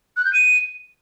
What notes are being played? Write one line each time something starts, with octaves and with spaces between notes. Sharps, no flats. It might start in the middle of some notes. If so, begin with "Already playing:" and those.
F#6
G6
D#7